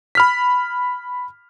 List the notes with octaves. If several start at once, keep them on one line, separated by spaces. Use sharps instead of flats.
B5 F6 B6